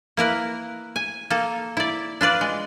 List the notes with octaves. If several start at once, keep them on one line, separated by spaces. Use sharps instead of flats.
A#3 E4 A#4 B4
G#5
A#3 A4
E4 D5
D4 F4 B4 D5
G#3